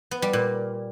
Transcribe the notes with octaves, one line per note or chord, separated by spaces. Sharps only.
B3
G3
A#2